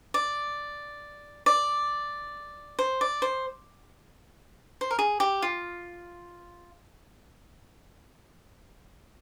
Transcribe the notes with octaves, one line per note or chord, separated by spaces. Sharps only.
D5
D5
C5
D5
C5
C5
A#4
G#4
G4
F4